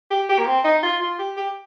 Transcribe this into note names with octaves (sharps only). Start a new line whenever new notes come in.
G4
G4
A#3
C4
D#4
F4
F4
G4
G4